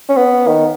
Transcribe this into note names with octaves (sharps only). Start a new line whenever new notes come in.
C#4
B3
D#3